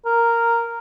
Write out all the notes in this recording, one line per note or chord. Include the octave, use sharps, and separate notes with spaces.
A#4